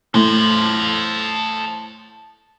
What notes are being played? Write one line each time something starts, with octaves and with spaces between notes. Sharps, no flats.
A2 A4 C5